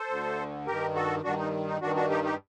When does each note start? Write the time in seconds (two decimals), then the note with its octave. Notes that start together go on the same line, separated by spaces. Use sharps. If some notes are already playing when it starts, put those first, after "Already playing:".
Already playing: A4 C5
0.09 D2 D3
0.67 G2 D#3 G4 A#4
0.95 F#4 A4
1.24 G2 D#3 D4 F#4
1.39 D#4
1.67 D#4
1.82 G2 D#3 D4 F#4
1.95 D4 F#4
2.10 D#4 G4
2.24 D#4 G4